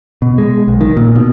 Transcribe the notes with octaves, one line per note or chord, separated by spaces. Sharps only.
B2
G#3
B1
D#3
A#2
B2